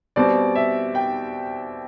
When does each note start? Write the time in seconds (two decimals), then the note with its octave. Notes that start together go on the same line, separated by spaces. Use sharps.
0.16 B2 G3 C4 D5
0.55 E5
0.95 G5